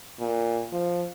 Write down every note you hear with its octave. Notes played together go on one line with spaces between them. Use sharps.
A#2
F3